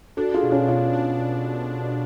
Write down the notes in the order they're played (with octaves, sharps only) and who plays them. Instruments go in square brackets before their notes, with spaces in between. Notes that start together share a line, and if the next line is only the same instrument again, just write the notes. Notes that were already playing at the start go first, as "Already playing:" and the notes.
[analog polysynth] D4 [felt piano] F#4 A4
[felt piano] F4 G#4
[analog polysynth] B2
[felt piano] C#4 F4
[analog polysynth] B2 [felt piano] C#4 F4
[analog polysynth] D4